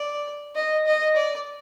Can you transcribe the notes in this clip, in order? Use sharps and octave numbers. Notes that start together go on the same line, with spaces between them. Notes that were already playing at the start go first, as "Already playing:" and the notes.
Already playing: D5
D#5
D#5
D5